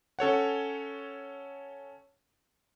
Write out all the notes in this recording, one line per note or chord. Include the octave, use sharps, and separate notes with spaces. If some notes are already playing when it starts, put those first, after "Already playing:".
C#4 A4 C#5 F#5